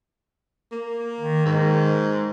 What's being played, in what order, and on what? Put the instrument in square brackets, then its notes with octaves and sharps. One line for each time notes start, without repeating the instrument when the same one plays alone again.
[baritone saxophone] A#3
[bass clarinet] D#3
[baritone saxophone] G#2